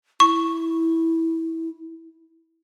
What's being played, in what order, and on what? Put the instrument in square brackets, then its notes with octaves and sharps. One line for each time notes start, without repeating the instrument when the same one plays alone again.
[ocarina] E4 [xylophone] C#6